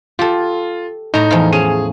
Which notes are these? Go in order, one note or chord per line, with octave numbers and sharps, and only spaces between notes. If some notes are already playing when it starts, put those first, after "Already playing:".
F4 G4 A4
A2 D#4 A#5
E2 F3 F4
C#4 G#4 D#7